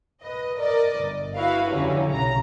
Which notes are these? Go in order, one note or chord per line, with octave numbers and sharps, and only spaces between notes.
B4 D#5
A#4 D5 D#5
G1
E4 F#4 B4 F5
F2 D3 F#3 G3 C#4 E4
B1 C#3 A#5